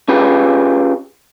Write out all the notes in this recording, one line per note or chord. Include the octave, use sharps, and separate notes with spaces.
C#4 F4 G4 G#4 B4